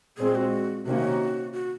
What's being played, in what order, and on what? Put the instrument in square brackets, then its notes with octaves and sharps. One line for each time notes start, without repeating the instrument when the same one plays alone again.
[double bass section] A#2 G#3 C4 [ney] G#4
[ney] F#4
[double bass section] C3 D#3 A#3 C#4 [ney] F#4
[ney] F#4